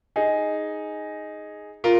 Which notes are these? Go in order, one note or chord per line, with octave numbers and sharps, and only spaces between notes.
D#4 G#4
F4 A#4